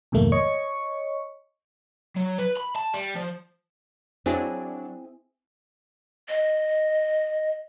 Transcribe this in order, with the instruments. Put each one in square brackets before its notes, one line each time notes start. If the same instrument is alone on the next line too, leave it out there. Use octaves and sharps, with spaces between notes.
[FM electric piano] B1 F2 G#2 D#3 A3 A#3
C#5 D#5 C#6
[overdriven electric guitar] F#3
B4
B5
A5
G3
F3
[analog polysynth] F#3 D4 [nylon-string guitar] C4 E4 G#4
[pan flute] D#5